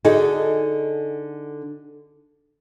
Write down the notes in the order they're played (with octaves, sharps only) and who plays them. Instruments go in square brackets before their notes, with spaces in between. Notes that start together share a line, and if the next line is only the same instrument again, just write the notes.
[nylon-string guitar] D3 D#4 F#4 G#4 A4